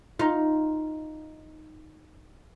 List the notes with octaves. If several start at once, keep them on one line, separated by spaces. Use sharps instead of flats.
D#4 F4